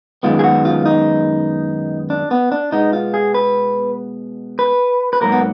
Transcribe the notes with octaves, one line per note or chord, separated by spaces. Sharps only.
F#2 D#3 G#3 B3 F4
G#4
F#4
F4
D#4
D4
B3
D4
B2 G#3 B3 D#4
F4
G#4
B4
B4
B4
G#2 F#3 A#3 A#4
B3